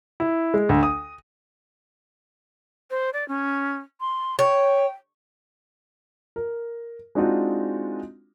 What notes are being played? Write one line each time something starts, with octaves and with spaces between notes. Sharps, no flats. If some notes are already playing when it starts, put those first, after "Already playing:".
E4
G#3
D2
D#6
C5
D5
C#4
C6
C#5 G5
A#4
G#3 C4 D4 D#4 F4 F#4